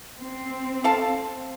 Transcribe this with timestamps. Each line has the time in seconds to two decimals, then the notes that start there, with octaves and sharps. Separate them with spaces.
0.18 C4
0.84 A4 F5 A5